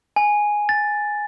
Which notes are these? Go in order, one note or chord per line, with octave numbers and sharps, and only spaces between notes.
G#5
A6